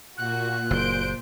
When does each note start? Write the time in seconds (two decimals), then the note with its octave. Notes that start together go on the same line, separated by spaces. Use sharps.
0.18 A#2 F#4 F#6
0.71 F#1 C5 G6 D7